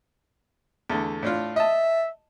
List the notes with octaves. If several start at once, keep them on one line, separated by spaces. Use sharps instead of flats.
E2 D3 A3
A2 D4 F4
D#5 E5 A5